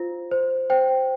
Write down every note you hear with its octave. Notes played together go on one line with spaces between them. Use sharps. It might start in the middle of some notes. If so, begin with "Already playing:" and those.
Already playing: F4 C5
C5
C5 G5